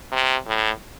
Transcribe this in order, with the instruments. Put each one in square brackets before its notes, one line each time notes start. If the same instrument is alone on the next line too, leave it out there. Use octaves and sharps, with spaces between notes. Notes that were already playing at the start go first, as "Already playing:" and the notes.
[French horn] C3
A2